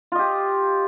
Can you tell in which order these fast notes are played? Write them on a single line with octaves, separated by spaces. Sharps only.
F4 D#5 G4